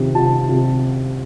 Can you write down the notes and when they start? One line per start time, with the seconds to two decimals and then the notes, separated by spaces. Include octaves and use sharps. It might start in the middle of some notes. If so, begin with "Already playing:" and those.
Already playing: C3 D#3
0.15 C3 A5
0.49 C3